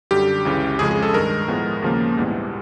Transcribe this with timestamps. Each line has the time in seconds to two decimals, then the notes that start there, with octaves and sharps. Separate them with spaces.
0.11 F#2 D3 G3 G4
0.45 C#2 C#3 E3
0.79 F2 C#3 F3 G#3 G#4
0.91 G#4
1.03 A4
1.13 G2 D#3 G#3 A#4
1.48 A2 F3 G#3 B3
1.82 D#2 C#3 F3 A#3
2.17 A#1 G#2 E3 G3 B3